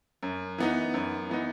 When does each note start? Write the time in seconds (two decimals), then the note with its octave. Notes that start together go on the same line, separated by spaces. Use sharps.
0.23 F#2
0.58 E3 B3 D#4
0.94 F#2
1.30 E3 B3 D#4